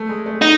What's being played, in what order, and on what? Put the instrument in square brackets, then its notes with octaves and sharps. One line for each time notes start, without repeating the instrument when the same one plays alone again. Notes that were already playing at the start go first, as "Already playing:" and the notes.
Already playing: [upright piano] A3
G#3
A3
[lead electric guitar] D#4